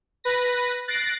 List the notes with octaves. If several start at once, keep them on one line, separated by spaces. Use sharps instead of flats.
B4 A#6
F#6 A6 A#6 C7 D7